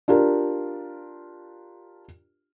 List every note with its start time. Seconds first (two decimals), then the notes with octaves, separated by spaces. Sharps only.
0.08 D4 F4 G4 A#4